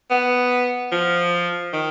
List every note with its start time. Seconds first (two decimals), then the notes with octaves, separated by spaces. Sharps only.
0.10 B3
0.92 F3
1.73 D#3